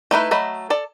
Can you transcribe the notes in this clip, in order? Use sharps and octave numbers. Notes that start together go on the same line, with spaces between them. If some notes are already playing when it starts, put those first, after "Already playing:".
A3 D#4 E4 B4
F#3 A3 D#5 B5
A4 D5